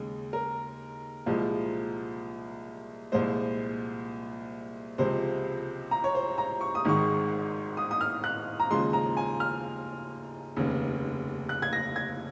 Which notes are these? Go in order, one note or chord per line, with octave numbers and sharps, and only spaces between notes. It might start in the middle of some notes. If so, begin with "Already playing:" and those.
Already playing: D#2 C#3 G#3
A#4
C2 A#2 F3 G#3
C2 A#2 F3 G#3 C5
C#2 C3 F3 G#3 C5
A#5
C#5
C5
A#5
C#6
D#6
G#1 G#2 D#3 G#3 C#6
D#6
D#6
F6
F#6
A#5
D#2 C#3 F3 G#3 C6
A#5
G#5
F6
F1 D#2 C#3
F#6
G#6
A#6
G#6